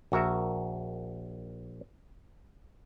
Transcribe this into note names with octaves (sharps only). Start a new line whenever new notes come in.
A#1 F#4 A#4 E5